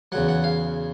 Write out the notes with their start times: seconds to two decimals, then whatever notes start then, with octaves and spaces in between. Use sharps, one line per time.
0.12 E2 C#3 F#3 F#5
0.28 F#5
0.44 F5